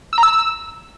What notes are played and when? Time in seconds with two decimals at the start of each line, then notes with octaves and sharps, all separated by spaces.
0.13 E6
0.18 A#5
0.23 E6